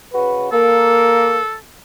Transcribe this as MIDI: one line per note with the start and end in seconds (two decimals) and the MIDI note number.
0.13 0.47 49
0.13 0.47 66
0.13 0.47 71
0.52 1.39 58
0.52 1.55 69